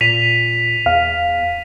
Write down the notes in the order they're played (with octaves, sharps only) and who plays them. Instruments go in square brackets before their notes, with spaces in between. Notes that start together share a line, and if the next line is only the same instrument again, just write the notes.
[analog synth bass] A#2 [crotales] B6 D#7 F7
[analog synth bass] E2 [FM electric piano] F5